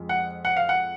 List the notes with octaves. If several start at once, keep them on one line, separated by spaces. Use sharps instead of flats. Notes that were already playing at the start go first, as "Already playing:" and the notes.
Already playing: F2 F3 G#3
F#5
F#5
F5
F#5